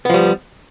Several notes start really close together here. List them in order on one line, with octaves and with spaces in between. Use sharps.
B3 F3 G3